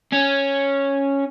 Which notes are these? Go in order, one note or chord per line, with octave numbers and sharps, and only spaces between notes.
C#4